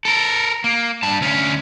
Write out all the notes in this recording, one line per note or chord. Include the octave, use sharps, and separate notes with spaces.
A4 A#4
A#3
G2 A5
D2 C#4